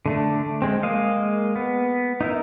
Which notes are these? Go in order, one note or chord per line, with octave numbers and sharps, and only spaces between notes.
D3 A3 D4
G#3 C4
G#3 A#3 D#5 F5
B3
D#4 E4 A#4